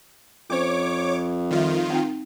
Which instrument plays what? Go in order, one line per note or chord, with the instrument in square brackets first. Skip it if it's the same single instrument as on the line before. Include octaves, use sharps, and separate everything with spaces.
[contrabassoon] F2 [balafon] C#4 C5 [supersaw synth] C#5 D6
[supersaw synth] D#3 F4 [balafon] G3 E5
[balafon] C4 D#4 G5